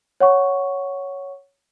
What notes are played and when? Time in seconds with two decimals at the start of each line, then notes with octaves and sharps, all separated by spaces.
0.20 C#5 F#5 C#6